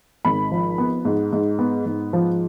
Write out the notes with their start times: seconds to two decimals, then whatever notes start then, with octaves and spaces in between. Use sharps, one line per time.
0.25 G#1 B5
0.51 F3
0.78 B3
1.05 G#2
1.33 G#2
1.59 B3
1.86 G#2
2.13 F3